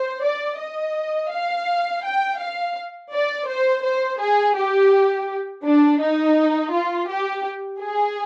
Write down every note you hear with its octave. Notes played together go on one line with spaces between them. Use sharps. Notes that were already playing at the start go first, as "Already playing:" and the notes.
Already playing: C5
D5
D#5
F5
G5
F5
D5
C5
C5
G#4
G4
D4
D#4
F4
G4
G#4